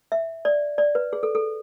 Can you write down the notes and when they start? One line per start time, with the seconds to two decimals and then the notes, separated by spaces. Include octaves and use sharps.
0.12 E5
0.45 D5
0.78 D5
0.95 B4
1.13 G#4
1.23 A4
1.35 A4